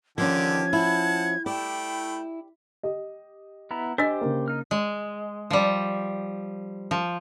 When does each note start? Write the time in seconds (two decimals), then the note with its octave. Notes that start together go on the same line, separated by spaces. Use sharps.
0.18 D3 D#3 F3 C#4 G4 A5 G#6
0.73 E4 F#5 A5
1.46 A3 E4 G4 D5 G5 B5
2.83 G4 D#5
3.71 B3 E4 A#5
3.98 D4 G4 C5 D#5 G#5 E6 A6
4.21 C#3 A#3
4.48 D#4 F6
4.71 G#3
5.50 F3 G3
6.91 F3